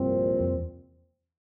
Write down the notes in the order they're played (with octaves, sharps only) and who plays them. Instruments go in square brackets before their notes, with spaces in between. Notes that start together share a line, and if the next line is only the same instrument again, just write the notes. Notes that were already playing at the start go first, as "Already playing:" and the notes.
Already playing: [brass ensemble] C2 A#2 F3 C4 [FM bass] G2
[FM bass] F2
E2